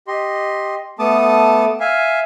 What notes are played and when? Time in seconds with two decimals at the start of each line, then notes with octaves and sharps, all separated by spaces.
0.08 G4 D#5 C6
0.99 A3 B3 A4 A5 D6 D#6
1.80 E5 F5 G#5